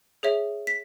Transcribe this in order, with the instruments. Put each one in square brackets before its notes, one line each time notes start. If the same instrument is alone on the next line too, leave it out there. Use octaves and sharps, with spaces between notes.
[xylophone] G#4 C#5 E5
B6